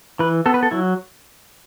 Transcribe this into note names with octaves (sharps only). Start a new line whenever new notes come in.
E3 B4
B3 A4
B4
A4
F#3 E4